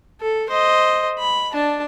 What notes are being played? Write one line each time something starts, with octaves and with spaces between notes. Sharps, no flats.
A4
C5 D#5
B5
D4 A5